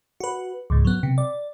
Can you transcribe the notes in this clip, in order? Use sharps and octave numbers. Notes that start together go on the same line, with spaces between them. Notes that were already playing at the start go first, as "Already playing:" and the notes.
F#4 B4
C#2 G#2
F#3 B3
C3
D5